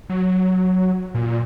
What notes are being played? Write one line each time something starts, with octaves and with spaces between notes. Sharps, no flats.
F#3
A#2